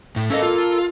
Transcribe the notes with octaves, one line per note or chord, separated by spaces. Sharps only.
A2
A#3 C#4 A4 C5 D#5
F4